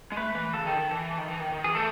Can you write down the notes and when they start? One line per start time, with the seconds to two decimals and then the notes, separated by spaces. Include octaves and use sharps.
0.12 G#3
0.17 A3 B4
0.35 E3
0.54 C#3 A4
0.66 D#3
0.78 D#3
0.91 E3
1.18 D#3
1.28 E3
1.40 D#3
1.52 D#3
1.64 E3 G#4
1.75 A3 A4